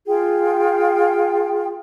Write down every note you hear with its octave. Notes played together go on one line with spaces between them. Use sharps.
F4 G#4 G5